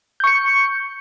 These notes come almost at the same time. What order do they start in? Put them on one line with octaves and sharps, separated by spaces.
G6 C#6 C#7